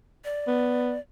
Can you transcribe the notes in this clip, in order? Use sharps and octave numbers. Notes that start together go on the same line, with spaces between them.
D5
B3